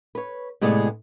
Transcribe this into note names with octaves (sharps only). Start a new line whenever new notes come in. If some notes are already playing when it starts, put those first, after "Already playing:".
B4 C#5
A2 C3 G#3 B3 G#4 D5